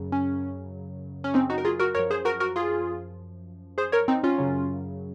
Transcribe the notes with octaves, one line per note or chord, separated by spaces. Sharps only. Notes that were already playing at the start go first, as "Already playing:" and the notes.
Already playing: F#2 C#3 F#3
C#4
C#4
C4 D#4
D#4 F#4
A#4
F4 G#4
F#4 A#4
F#2 F3 A#4 C#5
G#4 C5
F#4 A#4
F#4 A#4
F4 G#4
G#4 C5
A#4 C#5
C4 D#4
C#4 F4
F#2 C#3 F#3